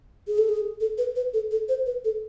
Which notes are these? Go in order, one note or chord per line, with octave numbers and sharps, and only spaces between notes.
G#4
A4
G#4
A4
B4
B4
A4
A4
C5
B4
A4